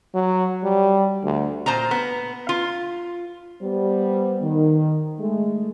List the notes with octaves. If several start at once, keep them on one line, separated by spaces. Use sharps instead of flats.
F#3
G3
D2
A#2 C5 A5 A#5
B3
F4
G3 B3 C5
D#3
G#3 A3